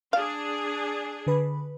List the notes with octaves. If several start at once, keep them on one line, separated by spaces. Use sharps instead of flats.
D4 G#4 F5
D3 B4 B5